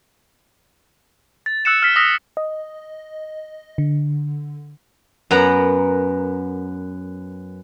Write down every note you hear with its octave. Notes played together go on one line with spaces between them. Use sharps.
A6
E6 F#6 C#7 E7
F6 B6
D#6 E6 A#6 B6
D#5
D3
F#2 B3 A#4 F#5 A#5